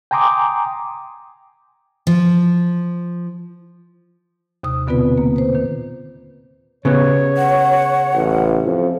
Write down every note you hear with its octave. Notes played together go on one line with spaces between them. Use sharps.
G5 G#5 A#5 C6 D6 D#6
F3
D#2 C3 D#6
B2 D3 B3 C4 F4 B4
A#3
B4 C5
A#2 D#3
C#3 B3 C#5
F#5
A1
F2